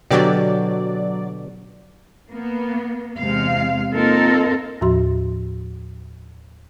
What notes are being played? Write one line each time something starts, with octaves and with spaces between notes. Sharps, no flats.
B2 D3 F#3 G4 D5
A#3 B3
E2 C3 G#3 F5
A#3 C4 D#4 F4 A4 A#4
D#2 A2 F3 F#4 C6